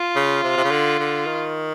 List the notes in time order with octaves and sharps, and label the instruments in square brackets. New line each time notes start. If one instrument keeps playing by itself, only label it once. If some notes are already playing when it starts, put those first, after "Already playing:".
Already playing: [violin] F4
[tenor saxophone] C#3
C3
C3
C#3
D3
D3
D#3